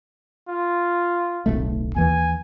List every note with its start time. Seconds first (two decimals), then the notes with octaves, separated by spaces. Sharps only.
0.48 F4
1.46 D1 B1 A3
1.96 D#2 E3 G#5